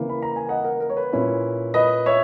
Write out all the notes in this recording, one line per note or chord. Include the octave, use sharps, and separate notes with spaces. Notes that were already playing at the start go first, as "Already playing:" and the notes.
Already playing: C#3 E3 A#3
B5
A#5
G#5
D#5 F#5
A#4
A#4
C#5
B4
A#2 A#3 C#4 E4
B4 D#5
C#5 E5